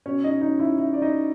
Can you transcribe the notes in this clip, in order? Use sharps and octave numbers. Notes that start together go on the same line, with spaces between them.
B2 C#4 C#5
D#4 D#5
D#4 D#5
E4 E5
E4 E5
D5
D#4 D#5